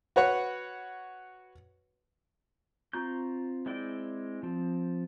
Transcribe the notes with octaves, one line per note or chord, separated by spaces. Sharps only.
F#4 B4 C#5 F#5
C4 F4 A#5 C#6 G6
G#3 C4 E4 D5 G5
F3 C4